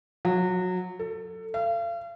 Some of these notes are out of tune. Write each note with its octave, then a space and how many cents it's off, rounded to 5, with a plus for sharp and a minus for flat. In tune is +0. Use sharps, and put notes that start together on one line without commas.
F#3 -20
A4 +20
F5 -40